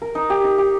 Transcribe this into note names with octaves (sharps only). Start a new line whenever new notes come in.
A#4
D#4
G4
D#4
G4